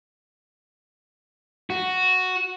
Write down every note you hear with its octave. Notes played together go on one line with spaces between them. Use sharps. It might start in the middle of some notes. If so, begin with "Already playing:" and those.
F#4